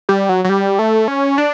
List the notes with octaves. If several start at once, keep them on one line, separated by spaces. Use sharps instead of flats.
G3
F#3
F#3
G3
A3
C#4
D4